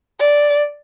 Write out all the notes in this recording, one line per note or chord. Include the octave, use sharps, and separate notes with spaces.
D5